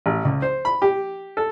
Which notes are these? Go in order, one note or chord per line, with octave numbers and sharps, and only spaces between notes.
A1
C#2
C5
B5
G4
A4